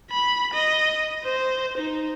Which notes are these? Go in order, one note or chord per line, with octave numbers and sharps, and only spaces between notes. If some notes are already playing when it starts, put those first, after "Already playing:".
B5
D#5
C5
D#4